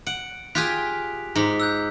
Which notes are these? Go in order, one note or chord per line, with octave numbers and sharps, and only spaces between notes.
F#5 D7
F4 G4 G#4 F#6 B6 F7
G#2 A#5 D6 B6
E6 F#6 G6